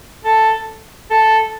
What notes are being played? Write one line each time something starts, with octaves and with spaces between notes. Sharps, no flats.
A4
A4